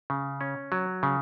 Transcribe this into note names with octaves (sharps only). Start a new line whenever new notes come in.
C#3
C#4
F#3
C#3